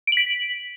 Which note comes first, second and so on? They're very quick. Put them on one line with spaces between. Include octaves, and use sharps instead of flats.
D7 F#7 B6